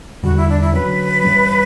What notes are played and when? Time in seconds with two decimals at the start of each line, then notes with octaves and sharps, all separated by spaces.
0.23 E2 D3 G3 F#4
0.36 E4
0.49 D4
0.61 E4
0.74 D3 F#3 C#4 B4
1.24 G2 E3 G3 C#4